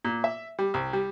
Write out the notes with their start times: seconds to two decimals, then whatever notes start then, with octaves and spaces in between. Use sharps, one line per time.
0.04 A#2
0.24 E5
0.59 G3
0.74 C2
0.93 G3